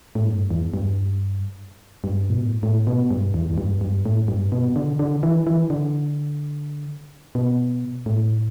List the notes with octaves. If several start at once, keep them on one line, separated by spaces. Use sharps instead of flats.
A2
G2
E2
G2
G2
B2
A2
A2
B2
G2
E2
E2
G2
G2
A2
G2
B2
D3
D3
E3
E3
D3
B2
A2